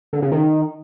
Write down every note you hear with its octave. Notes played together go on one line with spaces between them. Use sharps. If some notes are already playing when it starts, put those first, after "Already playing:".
D3
C#3
D#3